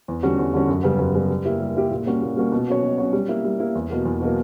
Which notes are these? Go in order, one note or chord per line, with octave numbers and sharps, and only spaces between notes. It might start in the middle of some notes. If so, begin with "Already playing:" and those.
E2
D3 G3 C#4 F#4
E2
D3 G3 C#4 F#4
F#2
C#3 G3 B3
F#2
C#3 G3 B3
G3
A#3 E4 G4
G3
A#3 E4 G4
A#2
G3 A#3 C#4 F#4
A#2
G3 A#3 C#4 F#4
B2
F#3 C#4 F#4 C#5
B2
F#3 C#4 F#4 C#5
G3
A#3 E4
G3
A#3 E4
E2
B2 F#3 A#3
E2
B2 F#3 A#3